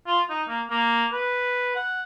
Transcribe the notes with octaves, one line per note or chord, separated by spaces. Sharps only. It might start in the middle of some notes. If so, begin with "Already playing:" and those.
F4
D#4
A#3
A#3
B4
F#5